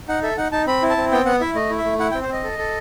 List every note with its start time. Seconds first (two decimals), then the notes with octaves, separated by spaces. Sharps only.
0.08 D#4 F#5
0.23 A4 E5
0.38 D#4 F#5
0.52 D#4 A5
0.67 C4 B5
0.83 E4
0.90 A5
0.97 C4
1.12 B3 G5
1.26 B3 F#5
1.40 E4 E5
1.55 A3 D#5
1.70 E4
1.78 E5
1.84 A3
1.99 E4 F#5
2.11 C4 G5
2.22 C5
2.29 C4 D#5
2.44 A4
2.58 A4